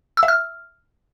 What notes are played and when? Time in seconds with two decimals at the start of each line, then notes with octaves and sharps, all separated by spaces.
0.17 E6
0.23 E5
0.28 F6